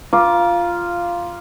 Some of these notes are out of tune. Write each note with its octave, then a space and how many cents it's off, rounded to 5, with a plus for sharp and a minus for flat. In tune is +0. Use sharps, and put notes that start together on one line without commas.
F4 -5 A#5 +30 D6 +0